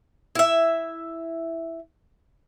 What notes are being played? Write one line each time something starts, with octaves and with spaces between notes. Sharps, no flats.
E4 E5